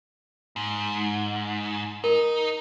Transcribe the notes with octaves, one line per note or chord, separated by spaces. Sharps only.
G#2
D#4 A#4